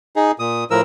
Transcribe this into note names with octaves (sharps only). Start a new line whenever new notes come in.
D#4 G#4
A#2 D#6
A2 F3 A#4 E6